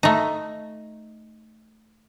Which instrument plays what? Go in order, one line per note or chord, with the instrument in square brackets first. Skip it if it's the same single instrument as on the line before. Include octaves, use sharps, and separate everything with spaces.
[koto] A3 D#4